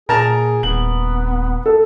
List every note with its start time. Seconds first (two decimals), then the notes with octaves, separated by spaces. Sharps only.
0.09 A#2 G#4 A#4 A5 A#5
0.63 D#1 B3 F#7
1.66 A4